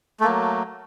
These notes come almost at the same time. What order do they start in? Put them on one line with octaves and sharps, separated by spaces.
A3 A#3 F#3